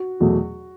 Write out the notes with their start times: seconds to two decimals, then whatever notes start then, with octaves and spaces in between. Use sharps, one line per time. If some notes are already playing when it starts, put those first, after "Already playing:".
Already playing: F#4
0.20 E2 B2 F#3 A3